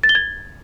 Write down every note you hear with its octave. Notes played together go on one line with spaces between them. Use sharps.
A6
G7
G#6